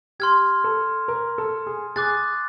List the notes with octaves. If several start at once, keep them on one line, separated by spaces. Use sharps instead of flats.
G4 C6 F6 G#6
A4
A#4
A4
G#4
G#4 D6 F#6 A6